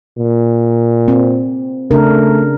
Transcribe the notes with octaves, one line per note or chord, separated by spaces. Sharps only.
A#2
C4
C#3 A3 D4 A#4